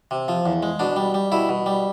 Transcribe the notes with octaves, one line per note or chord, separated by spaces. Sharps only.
C3
F3
E2
G#3
B2 D4
G3
G3
B2 E4
B2
G3